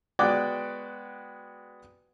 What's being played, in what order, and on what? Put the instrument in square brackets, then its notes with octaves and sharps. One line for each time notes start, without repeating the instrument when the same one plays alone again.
[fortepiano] G#3 B3 F#4 D5 G5 D6